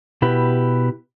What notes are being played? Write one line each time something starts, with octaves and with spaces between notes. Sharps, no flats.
B2 E4 G4 B4